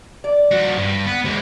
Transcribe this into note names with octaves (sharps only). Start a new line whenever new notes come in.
D5
F3 F#4
G2
B3
E3 G#3 C5